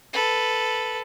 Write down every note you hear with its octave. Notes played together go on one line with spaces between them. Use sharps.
A4 B4